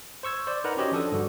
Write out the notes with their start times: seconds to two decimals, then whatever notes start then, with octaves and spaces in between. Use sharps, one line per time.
0.23 C5 C#6 E6 G#6
0.47 C5 D5
0.64 D#4 A#4 B4 D5 F#5 A#5
0.77 C#4 F#4 G4 C5 C#5 D#5
0.92 F3 D4 A4 D#6
1.12 G2 D3 F#4